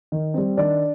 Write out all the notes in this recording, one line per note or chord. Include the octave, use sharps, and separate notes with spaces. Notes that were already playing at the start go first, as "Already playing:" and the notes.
D#3
G3 C4
D#3 D4 D5